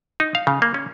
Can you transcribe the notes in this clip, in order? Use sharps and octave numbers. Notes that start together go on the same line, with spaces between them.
D#4
F5
C#3
A#3
C#4